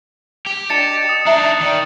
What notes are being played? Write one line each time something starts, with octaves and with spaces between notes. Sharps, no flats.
G4
D4 D#5 A5 A6 C#7 E7
D#6
D4 D#4 D#5 E5 A#5
D#3 D5